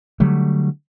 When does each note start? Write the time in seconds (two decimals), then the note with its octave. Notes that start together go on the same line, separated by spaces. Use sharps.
0.20 D3 F#3 G3 A3